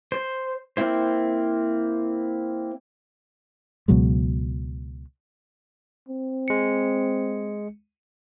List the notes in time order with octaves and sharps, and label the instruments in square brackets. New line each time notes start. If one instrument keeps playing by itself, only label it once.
[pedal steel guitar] C5
A#3 C4 E4 C5
[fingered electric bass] C#2 B2 F#3 G#3
[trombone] C4
[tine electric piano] G#3 C#7